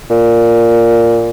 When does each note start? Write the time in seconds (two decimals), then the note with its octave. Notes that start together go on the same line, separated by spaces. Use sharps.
0.10 A#2